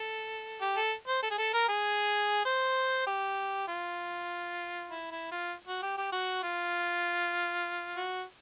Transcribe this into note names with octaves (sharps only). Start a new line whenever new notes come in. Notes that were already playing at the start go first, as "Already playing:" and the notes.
Already playing: A4
G4
A4
C5
A4
G#4
A4
A#4
G#4
C5
G4
F4
E4
E4
F4
F#4
G4
G4
F#4
F4
F#4